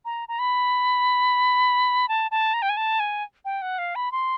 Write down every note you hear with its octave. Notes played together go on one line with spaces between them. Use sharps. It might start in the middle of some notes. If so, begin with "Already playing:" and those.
A#5
A#5
B5
A5
A5
A#5
G5
G#5
A5
G#5
G5
F#5
F5
B5
C6